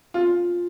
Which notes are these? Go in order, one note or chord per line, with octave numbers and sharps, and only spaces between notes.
F4